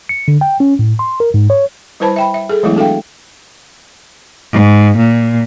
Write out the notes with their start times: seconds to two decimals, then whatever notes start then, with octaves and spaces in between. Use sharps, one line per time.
0.09 C#7
0.28 D3
0.41 G5
0.60 C#4
0.79 A2
0.99 C6
1.20 A#4
1.34 G#2
1.50 C#5
2.00 G3 E4 B4 C5 A5 B5
2.16 E5 G5 B5
2.34 E5
2.50 G#4 A4
2.63 E3 F#3 G#3 A3 B3 E4
2.76 D4 F#4 A4 E5 F5 G5
4.52 G#2
4.96 A#2